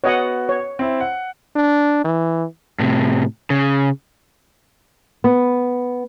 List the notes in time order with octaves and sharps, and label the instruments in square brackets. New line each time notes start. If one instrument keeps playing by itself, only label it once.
[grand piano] B3 F#4 [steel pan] C#5 D#5 F#5
[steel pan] C#5
[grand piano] C4 E4
F#5
[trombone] D4
E3
[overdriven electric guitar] A2 C3
C#3
[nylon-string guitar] B3